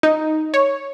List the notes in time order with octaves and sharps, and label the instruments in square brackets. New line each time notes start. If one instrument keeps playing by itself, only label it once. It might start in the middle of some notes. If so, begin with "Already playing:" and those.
[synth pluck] D#4
C#5